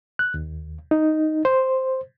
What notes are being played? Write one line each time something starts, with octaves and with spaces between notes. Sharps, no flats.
F#6
D#2
D#4
C5